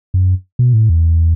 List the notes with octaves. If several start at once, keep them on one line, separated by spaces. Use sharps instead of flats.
F#2
B2
A2
E2